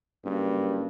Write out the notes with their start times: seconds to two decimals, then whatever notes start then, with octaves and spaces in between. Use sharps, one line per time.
0.25 F#1 G2